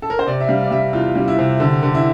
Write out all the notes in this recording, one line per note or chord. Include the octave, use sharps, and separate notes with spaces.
A4
A#4
C5
C3 D5
E5
G3 F5
D5
G3 E5
E2 F4
G3
E4
C3
D3
D3
E4